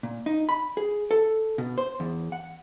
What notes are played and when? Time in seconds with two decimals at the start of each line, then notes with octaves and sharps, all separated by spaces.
0.03 A#2
0.26 D#4
0.49 B5
0.77 G#4
1.11 A4
1.58 B2
1.78 C5
2.00 E2
2.32 F#5